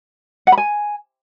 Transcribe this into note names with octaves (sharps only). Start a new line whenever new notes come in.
F#5
B5
G#5